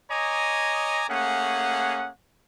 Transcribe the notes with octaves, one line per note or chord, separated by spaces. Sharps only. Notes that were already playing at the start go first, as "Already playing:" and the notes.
C#5 D#5 G#5 A#5 D6 D#6
A3 A#3 C#4 G#4 F#5